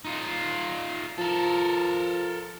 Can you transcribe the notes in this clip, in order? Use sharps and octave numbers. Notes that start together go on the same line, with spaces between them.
D#4 F4
F3 A4 A#4